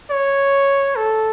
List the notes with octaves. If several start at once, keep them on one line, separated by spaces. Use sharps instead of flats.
C#5
A4